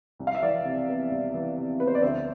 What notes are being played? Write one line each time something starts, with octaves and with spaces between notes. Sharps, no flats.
C2
F5
E5
E3 D5 F5
C3
B3
C2
E3
C3
B3 B4
C5
D5
D2 C5 E5